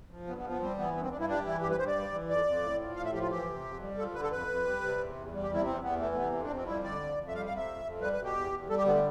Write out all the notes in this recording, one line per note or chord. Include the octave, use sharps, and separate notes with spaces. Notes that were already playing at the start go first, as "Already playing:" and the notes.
F3
G2 B3
B3
F3
B3
G3 C4
E3 B3
G2 B3
C4
G2 D4
E4
G3 D4
E3 E4
G2 G4
B4
G2 C5
D5
G3
E3
F2 D5
F2
A2
F3
A2 F5
E5
F3 G4
F4
E3 G4
C3
F2
G3
F3 A4
D3 B4
A4
F2 B4
F2
G3
C3
E2
E2
G3
G4
C3 E4
E2 C4
E2 B3
E3 A3
A3
C3 B3
F2
D4
F2
C4
G3 E4
D3 D5
F2
F2
E5
G3 F5
F5
C3
E5
F2
F2
G3 B4
B4
B2
G4
E2
E2
G3 A4
G4
D3 B3
A3